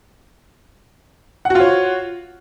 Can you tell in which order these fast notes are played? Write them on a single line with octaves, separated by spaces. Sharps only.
F#5 F#4 F4 C#5